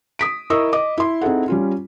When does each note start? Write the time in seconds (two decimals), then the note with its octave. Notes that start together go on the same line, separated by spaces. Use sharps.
0.19 D#6 B6 D7
0.50 E4 A#4 D#5 C#6 D#6 E6
0.73 D#5 D6
0.98 E4 C6
1.21 C4 D#4 E4 G#4 A4 F#5
1.48 G3 C#4 F4